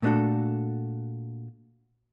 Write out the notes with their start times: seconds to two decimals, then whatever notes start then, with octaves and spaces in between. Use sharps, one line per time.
0.02 A#2 A3 B3 D4 F#4 A4